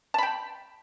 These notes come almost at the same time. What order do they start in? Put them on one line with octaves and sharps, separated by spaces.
A5 B5 G5